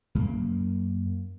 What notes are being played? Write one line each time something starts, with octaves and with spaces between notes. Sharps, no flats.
F#2 A#3